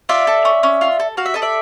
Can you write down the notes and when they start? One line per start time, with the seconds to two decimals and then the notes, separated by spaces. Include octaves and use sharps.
0.09 F4 D5 E5
0.27 A4
0.45 C#4
0.63 C#4
0.81 F4
1.00 A4
1.17 F#4 F5
1.26 E5
1.34 A4 D#5
1.42 D5 E5